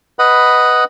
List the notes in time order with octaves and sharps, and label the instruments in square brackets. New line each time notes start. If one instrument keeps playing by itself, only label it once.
[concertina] B4 D#5 F#5 B5